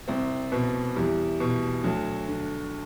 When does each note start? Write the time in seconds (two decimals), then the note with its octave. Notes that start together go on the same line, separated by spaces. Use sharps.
0.08 C2 C4
0.52 B2
0.96 E2 G3
1.40 B2
1.84 D2 F#3
2.29 D3